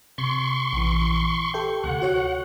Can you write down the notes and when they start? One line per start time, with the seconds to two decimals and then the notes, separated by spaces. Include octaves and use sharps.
0.18 C3 C6 C#6
0.73 A#1 E3
1.54 G4 A4 G5
1.84 D2 C3 F#5
2.02 F#4 C#5 F#6